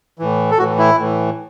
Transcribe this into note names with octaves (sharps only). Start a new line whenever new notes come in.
A2 E3
A4
A2 E3 F#4
E4
A2 E3